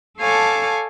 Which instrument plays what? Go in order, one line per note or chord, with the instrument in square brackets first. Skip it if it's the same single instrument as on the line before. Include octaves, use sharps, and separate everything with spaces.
[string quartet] A4 C#5 F5 G#5 A5 D6